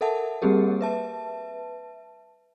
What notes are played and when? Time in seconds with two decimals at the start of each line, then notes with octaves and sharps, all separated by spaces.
0.01 A4 A#4 E5 F#5 A5
0.42 G3 A#3 C4 G4 G#4 A#4
0.81 B4 E5 A5